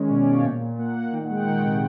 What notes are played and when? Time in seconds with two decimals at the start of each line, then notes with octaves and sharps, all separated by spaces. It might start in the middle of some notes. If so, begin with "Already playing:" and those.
Already playing: D#3 G#3 C#4
0.10 B2 D5
0.21 C#5
0.26 B2
0.33 F5
0.44 A#2 G5
0.61 A#2
0.78 A#3 F#5
0.95 A#2
1.12 D#3 G5
1.24 F#5
1.30 G#3
1.35 G5
1.47 D#3 F#5
1.64 C3